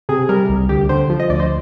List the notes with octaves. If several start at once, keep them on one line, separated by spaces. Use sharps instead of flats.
C3 G#4
G3 A#4
C2
D2 G4
D3 C5
F3
D#5
D2 D5
C5